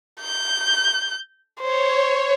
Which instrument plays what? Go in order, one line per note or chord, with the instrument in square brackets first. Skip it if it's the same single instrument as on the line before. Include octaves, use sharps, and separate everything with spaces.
[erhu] G6
[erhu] C5 [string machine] C#5